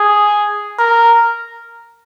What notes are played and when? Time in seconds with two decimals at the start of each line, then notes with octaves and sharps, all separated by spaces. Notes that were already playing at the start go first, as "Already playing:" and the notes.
Already playing: G#4
0.79 A#4